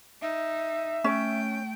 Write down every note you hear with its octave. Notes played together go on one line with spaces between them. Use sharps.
D#4 E5
A3 C#4 G5